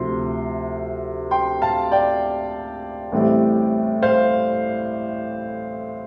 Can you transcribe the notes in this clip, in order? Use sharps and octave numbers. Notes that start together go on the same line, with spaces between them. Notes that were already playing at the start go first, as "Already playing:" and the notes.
Already playing: D2 C3 F3 C6
G5 C6
F5 A5
D5 G5
A1 A2 G3 C4
C5 F5